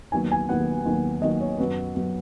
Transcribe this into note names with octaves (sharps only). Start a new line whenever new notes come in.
D#2 D#3 F#3 B3 G#5
G#5
D#2 D#3 F#3 B3 F#5
D#2 D#3 F#3 B3
D#2 D#3 F#3 B3 D#5
C#5
F#2 F#3 B3 B4
F#3 B3